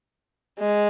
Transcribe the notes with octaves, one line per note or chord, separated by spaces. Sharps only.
G#3